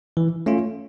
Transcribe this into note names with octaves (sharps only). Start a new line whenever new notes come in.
E3
A3 C#4 F4